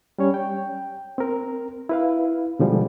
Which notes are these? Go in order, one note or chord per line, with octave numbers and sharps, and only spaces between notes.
G3 C#4 C#5
G5
C4 A#4
E4 B4 F5
B2 D3 F3 G3 G#3